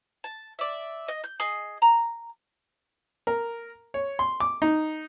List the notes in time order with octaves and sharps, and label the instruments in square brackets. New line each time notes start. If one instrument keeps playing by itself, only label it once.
[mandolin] A5
D5 E5
D#5
G6
G#4 D#5
A#5
[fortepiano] A#4
C#5
C6
D6
D#4